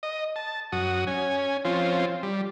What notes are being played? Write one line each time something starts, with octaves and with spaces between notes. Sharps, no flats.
D#5
A5
F#2 F#4 D#6
C#4 G#5
F3 C4 C#4 F4
G3